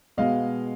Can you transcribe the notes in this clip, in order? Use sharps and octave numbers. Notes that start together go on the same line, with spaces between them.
B2 G#3 B3 D#5 F5